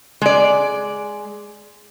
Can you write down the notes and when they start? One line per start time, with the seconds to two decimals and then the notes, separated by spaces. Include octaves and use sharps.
0.22 G#3 D5